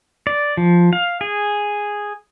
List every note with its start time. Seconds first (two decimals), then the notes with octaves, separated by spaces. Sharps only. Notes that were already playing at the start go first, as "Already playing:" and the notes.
0.27 D5
0.57 F3
0.93 F5
1.21 G#4